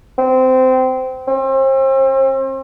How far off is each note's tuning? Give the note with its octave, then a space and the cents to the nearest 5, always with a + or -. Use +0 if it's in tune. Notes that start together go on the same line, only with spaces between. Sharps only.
C4 -20
C4 +40